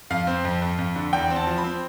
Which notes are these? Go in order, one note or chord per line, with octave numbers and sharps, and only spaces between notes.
F2 F5
C4
F2
F2
F2
D3
E2 G5
C4
A5
F3
B5
C4